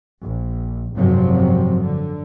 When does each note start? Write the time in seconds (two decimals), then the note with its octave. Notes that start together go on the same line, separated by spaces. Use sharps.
0.24 A#1
0.95 G#1 F#2 C3 F3 F#3
1.82 D3